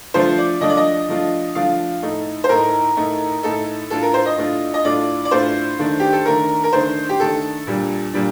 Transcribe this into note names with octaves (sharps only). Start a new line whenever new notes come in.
F3 A3 D4 F4 C5
D5
F3 A3 D4 F4 D#5
D5
D#5
F3 A3 D4 F4
F3 A3 D4 F4 F5
A2 A3 D#4
C5
A2 A3 D#4 A#4
A2 A3 D#4
A2 A3 D#4 A4
A2 A3 D4 F4 A4
A#4
C5
D#5
A2 A3 D4 F4
D#5
A2 A3 D4 F4 D5
D5
A2 A3 D4 F4 C5
D#3 A3 D4
G4
A4
D#3 A3 D4 A#4
A#4
D#3 A3 D4 C5
G4
D#3 A3 D4 A4
A#2 G3 D4
A#2 G3 D4